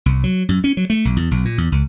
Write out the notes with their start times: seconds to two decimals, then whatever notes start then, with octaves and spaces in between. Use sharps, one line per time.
0.06 C2
0.24 F#3
0.49 F#2
0.64 C#4
0.77 F#3
0.90 A3
1.05 B1
1.16 E2
1.31 B1
1.45 A#2
1.58 E2
1.72 C#2